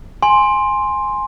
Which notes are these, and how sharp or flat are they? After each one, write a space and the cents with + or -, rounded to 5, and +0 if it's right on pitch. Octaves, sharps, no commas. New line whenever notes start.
G#5 +0 C6 +5